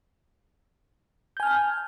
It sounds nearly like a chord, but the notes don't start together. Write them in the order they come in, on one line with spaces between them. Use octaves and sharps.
G6 G#5 F6 A5